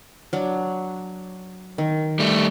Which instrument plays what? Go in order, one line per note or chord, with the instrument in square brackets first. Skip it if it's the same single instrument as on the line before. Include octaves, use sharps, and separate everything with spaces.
[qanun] F#3 D4
D#3
[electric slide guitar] G3 A3